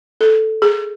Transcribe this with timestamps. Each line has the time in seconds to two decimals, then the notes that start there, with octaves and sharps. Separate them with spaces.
0.21 A4
0.62 G#4